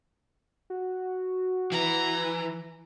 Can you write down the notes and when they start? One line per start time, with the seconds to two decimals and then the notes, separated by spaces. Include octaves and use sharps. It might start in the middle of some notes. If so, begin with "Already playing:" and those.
0.70 F#4
1.72 E3 A#5